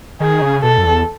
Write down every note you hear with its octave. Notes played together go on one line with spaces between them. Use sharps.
D#3 G#4
C#3
B2 A4
F#2
E2